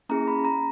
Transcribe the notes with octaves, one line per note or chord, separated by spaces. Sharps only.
A#3 C#4 E4 G#4 A#5
B5
A#5